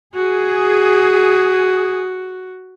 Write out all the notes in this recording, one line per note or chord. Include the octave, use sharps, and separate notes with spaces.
F#4 G#4